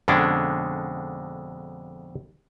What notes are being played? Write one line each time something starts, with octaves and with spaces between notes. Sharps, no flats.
F2 B2 D3 G#3 C#4 D4